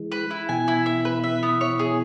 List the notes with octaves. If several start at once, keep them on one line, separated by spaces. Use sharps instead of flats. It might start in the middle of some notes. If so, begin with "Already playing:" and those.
Already playing: E3 G#3
B4
E4
B2 E3 G#5
E4
E5
B4
E5
B3
C#5
G#4